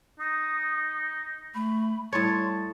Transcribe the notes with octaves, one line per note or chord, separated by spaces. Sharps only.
D#4 D#6
A3 B5
A2 G3 C#5 A5 C6